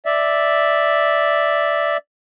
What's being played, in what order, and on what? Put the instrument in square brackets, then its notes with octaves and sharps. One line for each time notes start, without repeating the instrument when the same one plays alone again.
[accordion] D5 E5